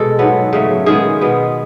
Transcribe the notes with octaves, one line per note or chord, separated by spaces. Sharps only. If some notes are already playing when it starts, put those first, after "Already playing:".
Already playing: B2 G#3 A4
G#2 F#3 B3
C#3 F#3 A3
D#3 G#3 B3 G#4
B2 G#3 B3